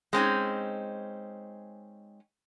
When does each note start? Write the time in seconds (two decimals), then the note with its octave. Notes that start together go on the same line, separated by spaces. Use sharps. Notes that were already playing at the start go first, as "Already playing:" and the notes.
0.13 G#3 C4 C#4 D#4